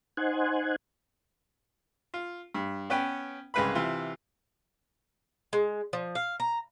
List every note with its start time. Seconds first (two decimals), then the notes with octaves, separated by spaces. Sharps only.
0.17 D#4 C5 F#5 G#5
2.14 F4
2.54 G2
2.90 B3 C#4 B4 G5
3.54 C2 C#3 G#3 B4 F5 B5
3.75 C3 E3 F4
5.53 G#3
5.93 F3
6.15 F5
6.40 A#5